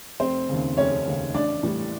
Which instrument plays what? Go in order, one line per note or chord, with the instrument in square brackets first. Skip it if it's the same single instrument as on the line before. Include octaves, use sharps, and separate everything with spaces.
[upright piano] F1 C4 C5
D#2 C#3
F1 C#4 C#5
D#2 C#3
A1 D4 D5
A2 E3 G3